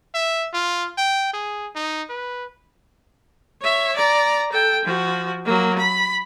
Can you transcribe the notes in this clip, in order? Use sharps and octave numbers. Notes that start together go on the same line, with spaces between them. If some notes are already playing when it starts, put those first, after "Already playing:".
E5
F4
G5
G#4
D#4
B4
C#5 E5
D5 A#5
A4 G5
F3 F#4
F#3 A#3
B5